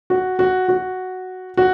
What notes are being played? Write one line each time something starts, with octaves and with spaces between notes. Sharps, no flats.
F#4
F#4
F#4
F#4